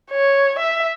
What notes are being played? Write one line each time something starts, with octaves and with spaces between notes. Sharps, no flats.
C#5
E5